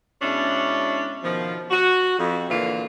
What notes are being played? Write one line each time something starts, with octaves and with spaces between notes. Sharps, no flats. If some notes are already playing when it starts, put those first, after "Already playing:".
B2 G#3 C#4 D4 E4
B2 D#3 F3
F#4
F2
A#2 D3 E3 A#3 F4